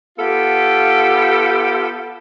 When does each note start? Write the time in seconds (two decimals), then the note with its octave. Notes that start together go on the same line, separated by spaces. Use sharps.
0.17 B3 F4 G4 A4